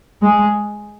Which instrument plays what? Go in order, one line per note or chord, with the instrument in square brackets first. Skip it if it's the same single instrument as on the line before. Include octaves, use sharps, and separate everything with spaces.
[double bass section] G#3